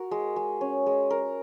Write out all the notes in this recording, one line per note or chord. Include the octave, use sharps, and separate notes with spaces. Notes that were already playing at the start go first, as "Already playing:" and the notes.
Already playing: F#4 A#4
G#3
G#3
C#4
G#3
A#4